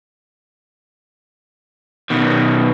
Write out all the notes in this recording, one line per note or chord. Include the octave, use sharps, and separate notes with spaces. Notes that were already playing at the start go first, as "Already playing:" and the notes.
B2 D#3